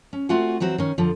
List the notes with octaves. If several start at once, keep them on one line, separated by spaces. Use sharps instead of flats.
C#4
A3 C4 F4 F#4 F#5 G#5
E3 F#3 C4 F#4
D#3 C#4
F2 D3 F3